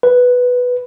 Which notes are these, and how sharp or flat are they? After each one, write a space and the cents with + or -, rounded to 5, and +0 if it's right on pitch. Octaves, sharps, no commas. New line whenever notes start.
B4 +0